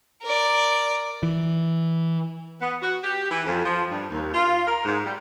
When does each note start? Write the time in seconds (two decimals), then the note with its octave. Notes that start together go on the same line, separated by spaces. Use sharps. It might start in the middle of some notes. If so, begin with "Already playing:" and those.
0.23 A#4 D5
1.23 E3
2.60 B3
2.81 F#4
3.04 G4
3.30 E3
3.45 F2
3.64 F3
3.90 G2
4.11 D#2
4.33 F4
4.66 A#4
4.85 G#2
5.05 G3